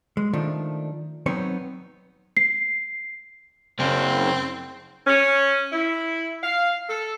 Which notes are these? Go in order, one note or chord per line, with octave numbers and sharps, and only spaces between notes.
G#3
D#3 F3 A3 D4
F#3 B3 C4 D#4 C#5
C7
F#2 C#3 C4
C#4
E4
F5
A4